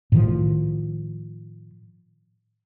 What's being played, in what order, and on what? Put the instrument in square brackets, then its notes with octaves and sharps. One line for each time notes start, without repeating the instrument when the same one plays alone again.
[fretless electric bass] A2 D#3 F3